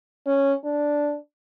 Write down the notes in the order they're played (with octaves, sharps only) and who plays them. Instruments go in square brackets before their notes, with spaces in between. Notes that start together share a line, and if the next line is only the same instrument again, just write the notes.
[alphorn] C#4
D4